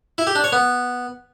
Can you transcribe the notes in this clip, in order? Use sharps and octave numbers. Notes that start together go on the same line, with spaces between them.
E4
G4
D4
C#5
B3